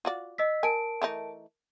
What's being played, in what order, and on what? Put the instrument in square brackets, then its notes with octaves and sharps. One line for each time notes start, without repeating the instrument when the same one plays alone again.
[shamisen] F4 F#4 D5
[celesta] D#5 E6 B6
[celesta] A#4 A5 D7 [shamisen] G#5
[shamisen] E3 A3 D#4